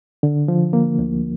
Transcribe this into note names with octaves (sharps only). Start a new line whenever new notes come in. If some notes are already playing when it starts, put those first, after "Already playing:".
D3
F3
A#3
D2